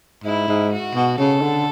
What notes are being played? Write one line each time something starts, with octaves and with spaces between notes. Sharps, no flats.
G#2 E4
G#2
F#4
B2
C#3 A4
D3